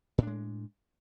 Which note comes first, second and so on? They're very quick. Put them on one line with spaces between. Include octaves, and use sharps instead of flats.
A2 D4 G#3